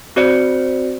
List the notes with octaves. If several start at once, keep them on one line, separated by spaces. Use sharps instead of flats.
C4 F#4 C5 D5 F#6 C#7